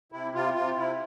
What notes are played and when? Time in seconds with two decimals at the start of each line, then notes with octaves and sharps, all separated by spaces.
0.12 C3 E4
0.34 C3 F4
0.55 C3 F4
0.76 C3 E4